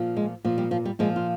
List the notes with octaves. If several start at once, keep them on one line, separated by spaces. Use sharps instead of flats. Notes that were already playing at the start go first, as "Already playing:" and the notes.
Already playing: A#2 F3
G#3
A#2 F3
G3
F3
G3
A#2 F3 G#3
F4